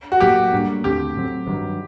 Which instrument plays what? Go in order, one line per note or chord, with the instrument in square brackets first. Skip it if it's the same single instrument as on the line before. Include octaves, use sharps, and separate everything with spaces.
[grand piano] F#4
[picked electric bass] A2 F#3 A#3 [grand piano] G4
[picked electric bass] A2 G3 A#3 D4
[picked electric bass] D#2 D3 A3 C4 [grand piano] G4
[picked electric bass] A2 F#3 C4
G2 D#3 F#3